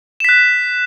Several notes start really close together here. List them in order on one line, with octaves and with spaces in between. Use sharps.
E7 B6 F#6